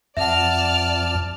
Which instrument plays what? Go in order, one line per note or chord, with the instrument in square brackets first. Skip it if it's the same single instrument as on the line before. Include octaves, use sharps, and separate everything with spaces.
[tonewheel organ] F2 [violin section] D5 A5 F6 [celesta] E5 F#5